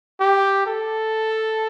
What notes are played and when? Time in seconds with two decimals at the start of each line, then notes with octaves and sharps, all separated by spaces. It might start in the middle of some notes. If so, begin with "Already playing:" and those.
0.20 G4
0.66 A4